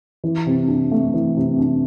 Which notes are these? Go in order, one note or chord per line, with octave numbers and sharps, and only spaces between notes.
E3
C3
D4
A3
E3
C3
D4